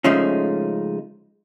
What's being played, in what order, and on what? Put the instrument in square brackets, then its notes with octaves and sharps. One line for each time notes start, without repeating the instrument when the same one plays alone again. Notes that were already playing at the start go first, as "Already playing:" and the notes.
[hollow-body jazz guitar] C#3 F3 G#3 A3 C#4 D#4